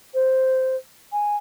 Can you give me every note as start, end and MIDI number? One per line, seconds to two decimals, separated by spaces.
0.14 0.76 72
1.13 1.37 80